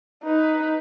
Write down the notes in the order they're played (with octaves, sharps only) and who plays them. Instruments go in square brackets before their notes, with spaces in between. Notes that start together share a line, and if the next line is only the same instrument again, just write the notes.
[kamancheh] D#4 B4